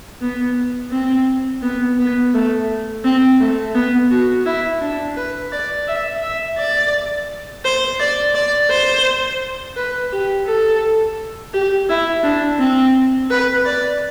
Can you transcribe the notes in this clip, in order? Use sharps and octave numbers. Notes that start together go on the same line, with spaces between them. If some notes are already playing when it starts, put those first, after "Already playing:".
B3
C4
B3
B3
A3
C4
A3
B3
F#4
E4
D4
B4
D5
E5
E5
D5
C5
D5
D5
C5
B4
G4
A4
G4
E4
D4
C4
B4
D5